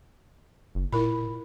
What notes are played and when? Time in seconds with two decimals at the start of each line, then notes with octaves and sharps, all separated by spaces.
0.75 F#1
0.93 A#2 E4 A#4 B5